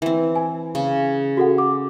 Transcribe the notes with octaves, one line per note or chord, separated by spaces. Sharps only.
E3 C4
G#5
C#3
F#4 A4 F#5
D6